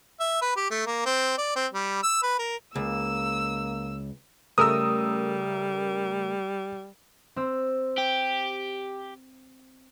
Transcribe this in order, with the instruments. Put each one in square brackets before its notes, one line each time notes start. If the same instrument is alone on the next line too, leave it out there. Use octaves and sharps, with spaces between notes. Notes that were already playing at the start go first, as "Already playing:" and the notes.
[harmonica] E5
B4
G4
A3
A#3
C4
D5
C4
G3
E6
B4
A#4
[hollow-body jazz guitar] C#2 [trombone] A#3 [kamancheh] E6
[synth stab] C#3 A3 A#4 [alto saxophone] G3 [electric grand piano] D#6 E6
[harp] C4 E6
[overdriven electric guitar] G4